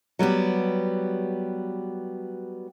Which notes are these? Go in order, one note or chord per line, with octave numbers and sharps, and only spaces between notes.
F#3 G3 B3 G4